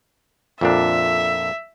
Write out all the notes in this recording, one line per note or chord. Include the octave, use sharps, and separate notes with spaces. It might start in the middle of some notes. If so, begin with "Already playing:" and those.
F2 A#2 D4 E5